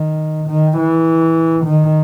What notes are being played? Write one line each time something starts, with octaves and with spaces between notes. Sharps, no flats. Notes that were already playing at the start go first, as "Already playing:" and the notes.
Already playing: D#3
D#3
E3
D#3